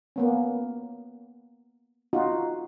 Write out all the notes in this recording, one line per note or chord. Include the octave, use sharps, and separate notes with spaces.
A#3 B3 C#4
D#4 F4 F#4